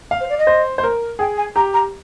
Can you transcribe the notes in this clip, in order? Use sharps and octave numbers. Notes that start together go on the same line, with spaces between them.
F5
C5
D5
D#5
C5
C5
A#4
G#4 G5
G#5
G4 A#5
A#5